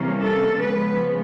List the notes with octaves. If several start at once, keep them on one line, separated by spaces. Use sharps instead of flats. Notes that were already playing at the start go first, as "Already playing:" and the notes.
Already playing: C3 E3 G3 A#3 C#4
A4
C#3 F3 G#3 B3 B4